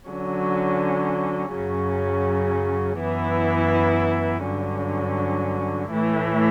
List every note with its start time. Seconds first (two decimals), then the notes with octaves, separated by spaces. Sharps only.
0.10 D3 F#3 C#4
1.55 F#2 C#3 F#3 C#4
3.01 F#2 E3 B3 E4
4.45 G2 D3 F#3 C#4
5.92 A2 E3 A3 E4